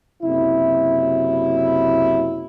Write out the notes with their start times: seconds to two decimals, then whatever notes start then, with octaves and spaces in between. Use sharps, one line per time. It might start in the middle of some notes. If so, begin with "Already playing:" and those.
0.23 F#1 C3 F#3 E4